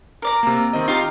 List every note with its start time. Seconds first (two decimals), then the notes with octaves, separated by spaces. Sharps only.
0.22 A#4 D5 A#5
0.43 C3 A#3
0.73 D#3 C4 D#5
0.88 D#4 F4 G4 F5 A#5